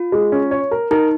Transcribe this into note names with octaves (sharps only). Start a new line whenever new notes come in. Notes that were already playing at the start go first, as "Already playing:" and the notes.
Already playing: F4
G#3
C#4
C#5
A#4
D#4 A#4